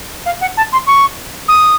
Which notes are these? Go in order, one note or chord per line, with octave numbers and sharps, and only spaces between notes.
F5
F#5
A5
C6
C#6
D#6